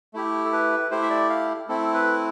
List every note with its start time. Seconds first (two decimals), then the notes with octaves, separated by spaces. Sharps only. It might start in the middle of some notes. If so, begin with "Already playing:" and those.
0.14 A3 E4 G4
0.45 A4
0.53 B4
0.91 A3 E4 G4 C5
1.02 E5
1.10 D5
1.29 F5
1.68 A3 C4 E4 A4
1.94 B4